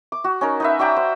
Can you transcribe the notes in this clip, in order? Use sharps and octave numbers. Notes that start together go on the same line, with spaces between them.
D6
F#4
C#4 D#4 A#4
D#4 B4 E5
F#4 D5 G5 A#5
C5